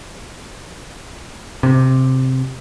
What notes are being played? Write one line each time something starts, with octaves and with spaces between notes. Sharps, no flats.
C3